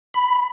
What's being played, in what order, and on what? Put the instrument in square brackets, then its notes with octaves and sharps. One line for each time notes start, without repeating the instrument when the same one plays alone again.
[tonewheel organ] B5